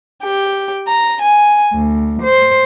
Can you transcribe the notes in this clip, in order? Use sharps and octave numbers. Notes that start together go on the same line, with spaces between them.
G4
A#5
G#5
D2
C5